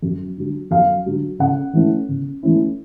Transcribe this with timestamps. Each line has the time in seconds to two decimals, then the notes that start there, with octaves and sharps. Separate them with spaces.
0.02 F#2
0.37 D3 F#3
0.71 F#2 F5
1.06 D3 F#3
1.39 C#3 F#5
1.73 E3 A3 C#4 E4
2.09 C#3
2.43 E3 A3 C#4 E4